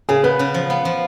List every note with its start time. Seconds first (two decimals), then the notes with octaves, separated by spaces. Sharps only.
0.09 C#3 G#4
0.24 B3 B4
0.39 C#3
0.54 F3
0.70 B3
0.85 F3